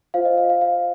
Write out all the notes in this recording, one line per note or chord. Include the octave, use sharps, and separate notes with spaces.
F4 C5 F5
D#5
F5
F5
F5